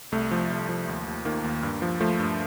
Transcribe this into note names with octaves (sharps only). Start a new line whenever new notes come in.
C2 A3
F3
C2
F3
D#2
D#2
D#3 A#3
D#2
G2
F3
F3 A3
G2